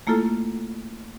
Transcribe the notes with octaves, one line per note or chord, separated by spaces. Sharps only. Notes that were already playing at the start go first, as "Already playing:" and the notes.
A3 A#3 E4 F4 A4